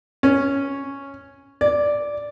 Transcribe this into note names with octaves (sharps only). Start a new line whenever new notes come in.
C#4
D5